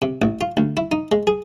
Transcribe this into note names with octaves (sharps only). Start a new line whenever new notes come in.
C3
A1
F4
D2
E4
D#4
G#3
G#4